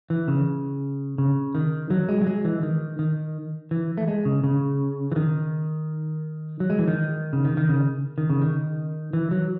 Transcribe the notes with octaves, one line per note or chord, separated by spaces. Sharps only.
E3
C#3
C#3
D#3
F#3
G#3
F#3
G#3
E3
D#3
D#3
E3
A3
G#3
C#3
C#3
E3
D#3
F#3
G#3
E3
D#3
C#3
D#3
D#3
C#3
D#3
C#3
D#3
E3
F#3